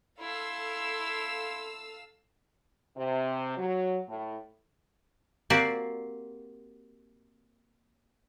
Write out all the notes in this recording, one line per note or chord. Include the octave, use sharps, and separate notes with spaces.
E4 A4 F5 C6 E6
C3
F#3
A2
A#3 C4 F#4 G4 D5